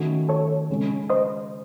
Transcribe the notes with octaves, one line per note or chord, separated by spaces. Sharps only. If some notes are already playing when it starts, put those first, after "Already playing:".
Already playing: D#3 A3 C#4 F#4 A4
A4 C#5
C#3 G#3 C#4
C5 D#5